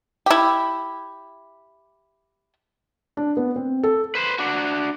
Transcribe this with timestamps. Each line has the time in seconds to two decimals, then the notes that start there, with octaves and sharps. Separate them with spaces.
0.26 E4 G4
3.17 D4
3.37 B3
3.56 C4
3.83 A4
4.15 B4 C5
4.39 D4 F#4